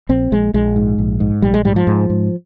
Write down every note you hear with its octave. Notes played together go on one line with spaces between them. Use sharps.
A#1 C4
A#1 G#3
A#1 G#3
G#2
A#1
G#2
A#1 G3
G#3
G#2 G3
F3
G#2
G#2